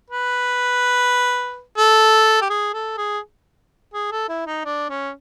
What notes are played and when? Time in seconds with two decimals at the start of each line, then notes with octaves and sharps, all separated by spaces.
0.10 B4
1.78 A4
2.42 G4
2.50 G#4
2.74 A4
2.97 G#4
3.94 G#4
4.11 A4
4.29 E4
4.47 D#4
4.65 D4
4.90 C#4